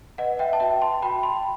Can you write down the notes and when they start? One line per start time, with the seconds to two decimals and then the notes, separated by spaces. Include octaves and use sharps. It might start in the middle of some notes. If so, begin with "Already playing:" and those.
0.18 B4 D#5 F#5
0.39 E5 G5
0.53 A5
0.60 F#4 E5 G5
0.82 A5 C6
1.02 F#4 G5 B5
1.23 A5 C6